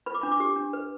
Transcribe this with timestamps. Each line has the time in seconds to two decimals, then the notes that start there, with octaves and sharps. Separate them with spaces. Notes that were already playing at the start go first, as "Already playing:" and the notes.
0.06 B4 B5
0.15 D6
0.21 D4 B5
0.31 D6
0.40 G4
0.56 D4
0.73 B4